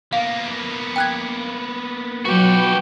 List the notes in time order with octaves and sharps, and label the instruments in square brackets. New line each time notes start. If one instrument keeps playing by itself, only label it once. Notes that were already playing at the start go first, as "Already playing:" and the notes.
[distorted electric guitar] A#3 B3 [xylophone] F5
[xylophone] G5 F#6 G#6
[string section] B2 F#3 B4 [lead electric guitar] F#4 G4